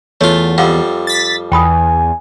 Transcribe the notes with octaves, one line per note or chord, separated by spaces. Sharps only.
E2 A3 F4 C#5
F2 G3 C4 F5 F#5
A6 B6
E2 G5 G#5 B5 D#6